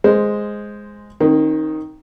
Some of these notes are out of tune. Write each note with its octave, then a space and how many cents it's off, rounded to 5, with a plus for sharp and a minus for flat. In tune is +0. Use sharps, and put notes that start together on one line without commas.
G#3 +0 C5 +0
D#3 +0 C4 +45